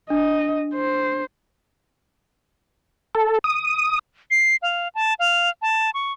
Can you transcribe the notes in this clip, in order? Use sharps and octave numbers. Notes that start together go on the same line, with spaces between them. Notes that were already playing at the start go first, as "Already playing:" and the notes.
D4 D#5
C5
A4
D#6
C7
F5
A5
F5
A5
C#6